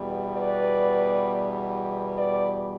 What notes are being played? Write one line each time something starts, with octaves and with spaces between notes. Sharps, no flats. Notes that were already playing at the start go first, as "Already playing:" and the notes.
Already playing: E2 B2 G3
B4 D5
B4 D5